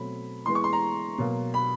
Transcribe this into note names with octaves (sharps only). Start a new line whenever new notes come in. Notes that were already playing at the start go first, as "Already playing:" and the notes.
Already playing: B2 F#3 A3 C4 B5
E3 G#3 B3 C6
C#6
C6
A#5
B2 F#3 A#3
B5